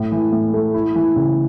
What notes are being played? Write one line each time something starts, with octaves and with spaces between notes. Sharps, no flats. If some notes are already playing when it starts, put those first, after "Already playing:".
Already playing: A2
E3
A2
A3
E4
E3
C#3